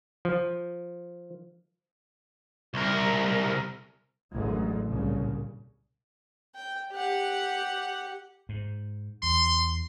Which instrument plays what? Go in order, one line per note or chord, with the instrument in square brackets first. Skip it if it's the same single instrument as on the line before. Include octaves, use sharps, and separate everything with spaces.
[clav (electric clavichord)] F3
[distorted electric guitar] C2 A#4
[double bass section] A1 F#2 D3 G#3
C2 A#2 C#3
[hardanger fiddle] G5
G4 F#5
[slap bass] G#2
[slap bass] E2 [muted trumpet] C6